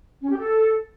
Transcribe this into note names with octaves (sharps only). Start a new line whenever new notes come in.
C#4
G4
A4